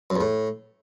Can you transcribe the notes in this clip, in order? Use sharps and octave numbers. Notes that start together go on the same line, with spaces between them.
F#2
E2
A2